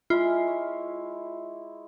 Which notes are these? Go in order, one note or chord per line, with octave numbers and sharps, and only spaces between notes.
G#3 E4 F4
C#5